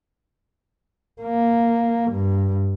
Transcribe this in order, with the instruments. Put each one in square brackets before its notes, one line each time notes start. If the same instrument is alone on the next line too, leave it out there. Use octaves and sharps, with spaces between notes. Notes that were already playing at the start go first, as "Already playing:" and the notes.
[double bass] A#3
G2